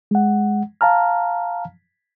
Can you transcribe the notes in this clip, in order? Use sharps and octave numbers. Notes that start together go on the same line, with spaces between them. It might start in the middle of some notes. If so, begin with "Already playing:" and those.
G#3 F#5
F5 A5 A#5 F6